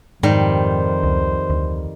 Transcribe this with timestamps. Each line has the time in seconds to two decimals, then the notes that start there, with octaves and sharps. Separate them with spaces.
0.23 F2 G#2 D#3 G3 C5
1.03 C#2
1.50 D2